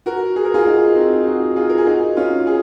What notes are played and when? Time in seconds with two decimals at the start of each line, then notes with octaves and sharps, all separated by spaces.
0.06 F#4 A#4
0.36 G#4
0.45 A#4
0.54 F4 G#4
0.66 D#4 F#4
0.96 C4 D#4
1.26 D#4 F#4
1.56 F4 G#4
1.69 A#4
1.78 G#4
1.86 D#4 F#4
2.16 C#4 F4
2.47 G#4